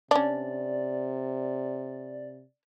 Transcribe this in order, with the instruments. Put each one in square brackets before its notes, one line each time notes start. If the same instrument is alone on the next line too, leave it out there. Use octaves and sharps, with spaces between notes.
[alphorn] C3 [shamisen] C#4 D4 [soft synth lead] D5